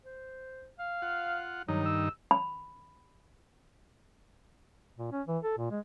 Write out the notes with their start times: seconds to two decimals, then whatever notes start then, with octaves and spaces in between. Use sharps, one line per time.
0.05 C5
0.79 F5
1.02 F4 F#5
1.68 G2 D#3 F#3 D#4
1.86 E6
2.31 B5
4.98 A#2
5.12 C#4
5.27 E3
5.44 A4
5.58 A#2
5.71 G#3